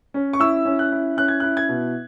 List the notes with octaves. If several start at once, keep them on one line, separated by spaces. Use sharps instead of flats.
C#4
C#6
E4 E6
C#4
F#6
E4
C#4 F#6
G#6
E4 F#6
G#6
B2